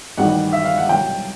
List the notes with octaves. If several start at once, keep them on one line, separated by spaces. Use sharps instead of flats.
A1 G2 D#3 G3 F#5
E5
F5
F#5
C2 B2 F#3 G5